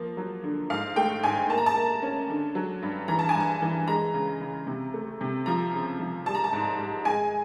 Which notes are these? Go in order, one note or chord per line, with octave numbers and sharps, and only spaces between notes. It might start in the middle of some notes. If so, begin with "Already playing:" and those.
Already playing: F3 A#3
F#3
D3
G#2 F5
A3 G5
G#2 G#5
A#3 A5
A#5
A5
A#3
C#4
D3
F#3
G2
E3 A#5
A5
G#5
G2
A5
E3
G#3 A#5
C#3
C#3
C3
A3
C3
F3 A#5
C#3
F3
G3 A5
A#5
A5
G#2
G#2
G#3 G#5